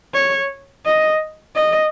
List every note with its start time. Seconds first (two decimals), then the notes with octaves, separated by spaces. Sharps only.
0.14 C#5
0.85 D#5
1.55 D#5